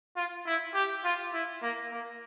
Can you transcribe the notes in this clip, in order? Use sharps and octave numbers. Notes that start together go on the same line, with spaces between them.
F4
E4
G4
F4
E4
A#3
A#3